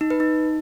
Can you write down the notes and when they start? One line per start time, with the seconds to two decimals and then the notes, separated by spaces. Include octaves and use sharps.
0.01 D#4
0.10 B4
0.20 D#4